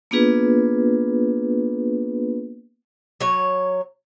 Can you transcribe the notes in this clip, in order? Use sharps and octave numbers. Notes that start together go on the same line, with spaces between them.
A#3 B3 D4 F4 G#4 B4
F#3 C#5